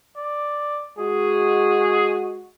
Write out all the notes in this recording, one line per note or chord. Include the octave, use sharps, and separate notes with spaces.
D5
G#3 F#4 G#4